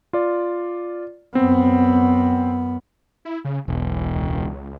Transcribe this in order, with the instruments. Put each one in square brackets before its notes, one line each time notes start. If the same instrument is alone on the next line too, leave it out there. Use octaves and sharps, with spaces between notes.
[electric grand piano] F4 D5
[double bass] F#2 B3 [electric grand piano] C4
[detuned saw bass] E4
C#3
[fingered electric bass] E1 [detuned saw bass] B1
[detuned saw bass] C#2